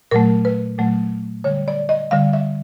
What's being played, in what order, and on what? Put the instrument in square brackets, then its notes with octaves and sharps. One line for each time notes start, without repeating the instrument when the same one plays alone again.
[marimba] A#2 F#3 A3 A#4
B4
A#2 F#3 A3
D3 G3 C#5
D5
D#5
D3 G3 F5
E5